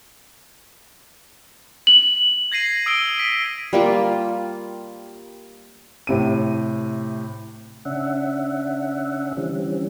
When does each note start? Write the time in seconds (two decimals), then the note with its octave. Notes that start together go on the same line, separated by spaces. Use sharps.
1.87 F#7
2.52 G#6 A#6 C7 D#7 F#7
2.86 D#6 E6 D7 D#7 G7
3.19 B6 D#7
3.73 G3 A#3 F4
6.07 A2 C3 D#7
7.85 C#3 C#4 D4 E5 F#5
9.37 D3 E3 G3 C4 C#4